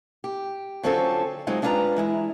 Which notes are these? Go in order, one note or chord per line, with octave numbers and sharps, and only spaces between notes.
G4
D3 F#3 C4 C#4 F4 A4
F#3 G#3 C4 D#4 F4
G#3 D4 E4 F4 B4 A#5
E3 G#3 E4